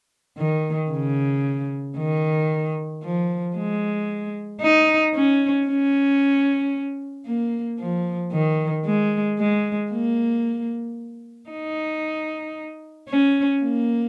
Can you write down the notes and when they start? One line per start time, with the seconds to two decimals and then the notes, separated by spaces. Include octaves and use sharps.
0.38 D#3
0.91 C#3
1.97 D#3
3.03 F3
3.56 G#3
4.62 D#4
5.14 C#4
5.67 C#4
7.26 A#3
7.79 F3
8.32 D#3
8.85 G#3
9.39 G#3
9.91 A#3
11.50 D#4
13.09 C#4
13.62 A#3